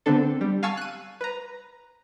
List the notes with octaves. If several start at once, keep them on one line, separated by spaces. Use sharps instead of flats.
D3 B3 C4 D4 A4
G3
F5 G#5 A5 C#6 E6
F#6 D#7
B4 A#5